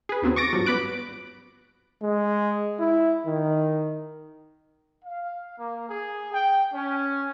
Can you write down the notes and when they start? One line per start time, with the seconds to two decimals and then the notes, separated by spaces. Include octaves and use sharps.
0.09 G#4 B4
0.22 D#2 C#3 F#3 B3 C4
0.36 C#6 D6 A6 A#6 D7
0.53 G#1 G2 F3 F#3
0.66 G2 B3 B5 D6 F#6 D7
2.03 G#3
2.79 E4
3.27 D#3
5.05 F5
5.58 A#3
5.89 G#4
6.32 G5
6.74 C#4